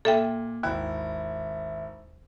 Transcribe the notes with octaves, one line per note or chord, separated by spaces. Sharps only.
A#2 A4 E5 G5
G#1 D#2 E4